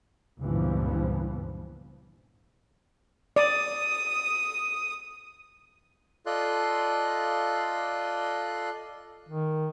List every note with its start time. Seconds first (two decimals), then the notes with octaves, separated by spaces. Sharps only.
0.41 C#2 G2 A#2 E3 F3 B3
3.36 D5 D#6
6.26 F4 A4 D5 D#5 C6 F#6
9.29 D#3